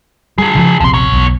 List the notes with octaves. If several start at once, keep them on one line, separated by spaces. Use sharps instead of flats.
D3 G3 G#4
C#3 E3 F3
D#1 A#1 C3 F3 C6
B2 C#5
B1 E2